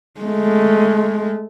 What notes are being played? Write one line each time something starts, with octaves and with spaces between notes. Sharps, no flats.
G#3 A3